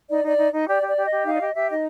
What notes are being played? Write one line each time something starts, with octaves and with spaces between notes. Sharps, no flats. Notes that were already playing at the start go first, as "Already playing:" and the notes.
D#4 D5
D#4 D5
D#4
D#4
G4 D5
G4
D5
G4
D#5
G4
D#4 F5
D5
G4 D#5
G4 E5
D#4 D#5